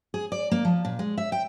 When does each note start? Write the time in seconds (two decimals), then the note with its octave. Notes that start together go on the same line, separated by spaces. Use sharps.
0.14 G#4
0.32 D5
0.51 A#3
0.65 F3
0.85 A#2
0.99 G#3
1.18 E5
1.32 G5